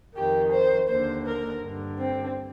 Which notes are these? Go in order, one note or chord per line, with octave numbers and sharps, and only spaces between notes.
F2 D#3 G4
C5
D#2 D3 C5
A#4
G2 D3
C4